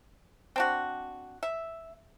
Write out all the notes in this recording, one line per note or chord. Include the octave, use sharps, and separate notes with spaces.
C4 D4 F#4
E5